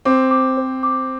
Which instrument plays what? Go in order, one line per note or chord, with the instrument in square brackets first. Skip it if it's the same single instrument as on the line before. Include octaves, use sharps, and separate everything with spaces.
[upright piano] C4 [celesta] D6
[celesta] D6
C5
D6